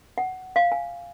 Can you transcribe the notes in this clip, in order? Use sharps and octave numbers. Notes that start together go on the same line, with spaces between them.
F#5
F5
G#5